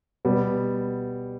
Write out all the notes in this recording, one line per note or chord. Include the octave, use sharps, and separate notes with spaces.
B2 G3 B3